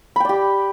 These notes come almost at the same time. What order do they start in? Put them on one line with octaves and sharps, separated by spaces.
B5 G5 D5 G4